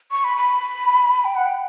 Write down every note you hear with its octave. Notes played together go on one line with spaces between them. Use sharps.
C#6
B5
B5
G5
F#5
G5